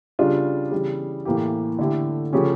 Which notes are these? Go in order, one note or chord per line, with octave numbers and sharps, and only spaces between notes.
C#3 G3 D4 F4
C#3 E3 G3
A2 E3 A#3 E4 G4
D3 A3 E4 G4
C#3 F3 A3 C#4 G4